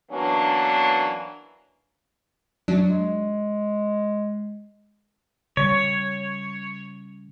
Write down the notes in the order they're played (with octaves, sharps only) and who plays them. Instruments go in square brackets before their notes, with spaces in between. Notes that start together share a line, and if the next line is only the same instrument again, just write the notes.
[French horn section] E3 F#3 A#3 B3 C#4 D4
[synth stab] F#2 F#3 D4
[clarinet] G#3
[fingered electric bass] C#3 G3 [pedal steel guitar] C#5